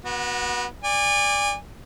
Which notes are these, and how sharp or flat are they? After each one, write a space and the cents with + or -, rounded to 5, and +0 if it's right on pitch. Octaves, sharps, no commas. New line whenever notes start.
B3 -30 F#4 +0
D5 +0 G#5 -30